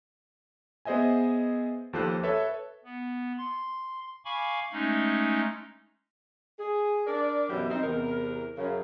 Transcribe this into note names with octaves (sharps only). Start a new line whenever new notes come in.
B3 G#4 C5 D#5 E5 G#5
D#2 F3 G4 A4 C5 F#6
A4 B4 C#5 E5
B3
C6
F5 G#5 B5 C#6 D6
G#3 A3 C#4 D#4
G#4
D4 A#4 D5
F#2 B2 E3 F#3 E4 G4
C4 D#4
E2 C3 A#4
F#2 C#3